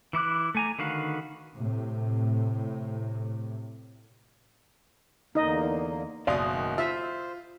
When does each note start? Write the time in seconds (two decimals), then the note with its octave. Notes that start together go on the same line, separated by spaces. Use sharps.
0.13 E3 E4 D6 F#6
0.55 A3 G#5 A#5
0.79 D3 D#3 F#4 B4 F5
1.56 A2 C3
5.35 E2 D3 A#3 D#4 D#5
6.27 F#1 B2 D5 F5 C6 D#6
6.48 D#3
6.78 F4 C5 E5